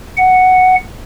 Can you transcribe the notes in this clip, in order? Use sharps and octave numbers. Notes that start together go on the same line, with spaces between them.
F#5